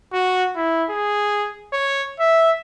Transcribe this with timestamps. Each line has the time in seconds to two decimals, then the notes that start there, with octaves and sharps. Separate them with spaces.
0.13 F#4
0.56 E4
0.90 G#4
1.73 C#5
2.20 E5